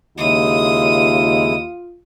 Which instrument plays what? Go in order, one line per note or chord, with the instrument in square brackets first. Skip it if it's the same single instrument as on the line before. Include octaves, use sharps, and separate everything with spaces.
[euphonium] D#2 [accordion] C#3 G#3 E4 [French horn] F4 [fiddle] D#6